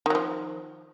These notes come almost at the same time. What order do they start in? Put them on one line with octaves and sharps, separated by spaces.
D#3 F#3 F3